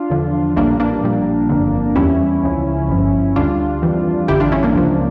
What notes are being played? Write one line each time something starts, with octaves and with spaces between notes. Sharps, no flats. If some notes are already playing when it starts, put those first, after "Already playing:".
Already playing: D4 F4
E2 D3 F3
A#1 A2 E3 G3 A#3 D4
A#3 D4
A#1 A#2 G3
G1 F2 D3
E2 E3 G3 C#4 E4
C#2 C#3 F3
G1 G2 F3
D2 D3 G3 D4 F4
F2 E3 G3
A1 G2 D3 E4 G4
D4 F4
C#4 E4
A#3 D4
C#2 C#3 F3